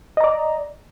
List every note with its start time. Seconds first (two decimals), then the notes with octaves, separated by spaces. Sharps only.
0.17 D#5
0.21 A#5
0.24 D5